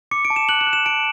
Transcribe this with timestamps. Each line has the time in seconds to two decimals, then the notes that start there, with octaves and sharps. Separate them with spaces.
0.11 D6 C#7
0.25 D7
0.30 A5
0.36 E7
0.49 F#6 F#7
0.61 E7
0.67 F#6
0.73 E7
0.86 A5 D7